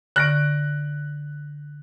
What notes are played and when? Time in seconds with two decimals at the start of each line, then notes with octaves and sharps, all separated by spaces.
0.16 D3 C#6 F#6 A#6 D7